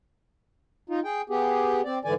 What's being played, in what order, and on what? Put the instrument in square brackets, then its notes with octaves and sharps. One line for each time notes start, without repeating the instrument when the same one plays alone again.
[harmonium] D#4 F4
G#4 G5
B3 G4 G#4
C4 D5
G#2 D3 E3 D5 G#5